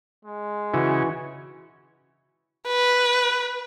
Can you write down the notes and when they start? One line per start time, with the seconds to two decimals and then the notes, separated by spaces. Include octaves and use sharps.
0.25 G#3
0.73 C#3 E3 F#4
2.67 B4